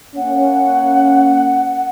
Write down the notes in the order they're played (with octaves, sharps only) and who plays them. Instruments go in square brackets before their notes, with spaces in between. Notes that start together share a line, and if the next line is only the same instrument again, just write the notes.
[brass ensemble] A#3 C#4 [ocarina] F#5